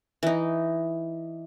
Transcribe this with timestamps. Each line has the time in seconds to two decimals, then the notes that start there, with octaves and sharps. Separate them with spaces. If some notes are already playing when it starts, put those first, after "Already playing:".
0.23 E3 D#4